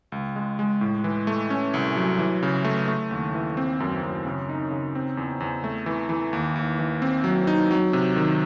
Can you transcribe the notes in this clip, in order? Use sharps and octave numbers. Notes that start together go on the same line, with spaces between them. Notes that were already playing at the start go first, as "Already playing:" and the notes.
C#2
G#3
G#3
A2
E3
A3
C#4
C2
F#3
E3
C#3
A3
A3
D#2
E3
C4
F#2
F#2
C#3
D#4
C#3
C4
E2
E2
A3
E3
E3
D#2
D#2
E3
C4
F#3
D#4
F#3
C3
D#3